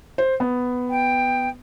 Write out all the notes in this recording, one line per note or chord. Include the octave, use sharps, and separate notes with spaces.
C5
B3
G5